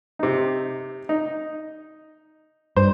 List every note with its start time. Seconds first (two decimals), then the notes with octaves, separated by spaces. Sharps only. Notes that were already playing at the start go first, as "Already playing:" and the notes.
0.19 C3 D#4
1.09 D#4
2.76 G2 C5